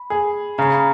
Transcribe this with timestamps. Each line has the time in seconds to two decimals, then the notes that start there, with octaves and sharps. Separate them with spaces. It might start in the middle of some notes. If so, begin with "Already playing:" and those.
Already playing: B5
0.10 G#4
0.58 C#3 A#5
0.67 B5
0.77 A#5